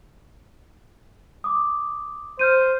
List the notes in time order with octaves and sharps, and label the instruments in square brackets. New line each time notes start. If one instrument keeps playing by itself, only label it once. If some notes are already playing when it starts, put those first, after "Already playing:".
[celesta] D6 D#6
[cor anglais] C5 [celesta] F6 G6 D#7